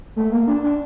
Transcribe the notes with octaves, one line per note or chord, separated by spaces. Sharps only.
A3
A#3
D4
D4